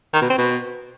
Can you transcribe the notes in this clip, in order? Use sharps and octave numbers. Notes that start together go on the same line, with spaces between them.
D#3
B2
C4
B2